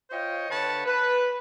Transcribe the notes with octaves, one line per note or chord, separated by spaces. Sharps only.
F4 C5 C#5 D#5 G5
D3 B4 C#5 A5 B5
B4